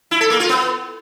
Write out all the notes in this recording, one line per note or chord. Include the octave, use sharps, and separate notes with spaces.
E4
A4
A#3
F4
B3